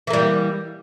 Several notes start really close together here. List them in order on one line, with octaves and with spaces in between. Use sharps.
E3 A#3 G3